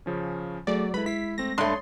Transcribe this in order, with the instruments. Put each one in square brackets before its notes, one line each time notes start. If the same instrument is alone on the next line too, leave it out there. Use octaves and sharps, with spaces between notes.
[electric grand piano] C#3 F3 C#4
[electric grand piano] F#3 [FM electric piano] A3 G#4 [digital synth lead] D5
[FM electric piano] G#3 [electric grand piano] E4 A4 B4 [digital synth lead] B5
[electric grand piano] E4 C7 [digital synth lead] B6
[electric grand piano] A3 C4 [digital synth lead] A#6
[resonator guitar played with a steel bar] G2 A3 [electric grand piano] C#5 D#6 [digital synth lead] C6